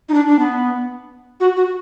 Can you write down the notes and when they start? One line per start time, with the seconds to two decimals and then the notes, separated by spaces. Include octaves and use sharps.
0.09 D#4
0.14 D4
0.28 D4
0.39 B3
1.40 F#4
1.57 F#4